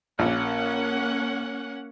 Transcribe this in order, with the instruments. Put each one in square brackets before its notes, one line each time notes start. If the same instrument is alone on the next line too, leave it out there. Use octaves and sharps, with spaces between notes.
[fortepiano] A#1 [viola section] A#3 C#4 F#5